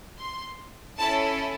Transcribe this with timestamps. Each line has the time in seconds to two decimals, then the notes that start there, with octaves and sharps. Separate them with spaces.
0.19 C6
0.97 C#4 E4 A4 A5